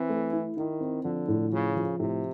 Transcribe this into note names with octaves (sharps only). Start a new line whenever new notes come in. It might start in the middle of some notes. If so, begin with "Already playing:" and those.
Already playing: E3 C4
A3
E4
D#3 E4
C4
D3 F3
A2
C#3 F3
F3
A2 C3